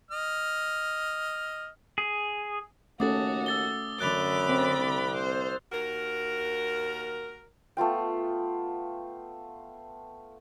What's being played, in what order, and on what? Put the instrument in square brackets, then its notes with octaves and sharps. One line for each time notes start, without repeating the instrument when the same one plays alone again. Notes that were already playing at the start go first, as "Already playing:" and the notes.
[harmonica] D#5 F6
[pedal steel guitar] G#4
[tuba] D#2 [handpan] A3 C#4 A4 [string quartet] F#4 [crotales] D6 D#6 A6
[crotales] E6 A6 G7
[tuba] F#2 [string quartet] D3 B5 D6 [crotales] F#6 A6 F7
[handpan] C4
[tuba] C2
[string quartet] C5
[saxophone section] D#2 F#4 A#4
[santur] A3 B3 F4 G5